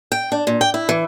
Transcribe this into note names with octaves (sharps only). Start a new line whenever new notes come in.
G5
D4
A#2
G5
E4
E3